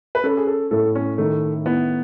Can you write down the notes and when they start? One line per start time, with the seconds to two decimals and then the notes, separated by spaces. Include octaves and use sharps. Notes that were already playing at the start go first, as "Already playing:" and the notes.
0.15 B4
0.23 C#4 A4
0.37 G#4
0.47 A4
0.71 A2 A4
0.95 C#4
1.18 D#3 A3
1.66 B3 E4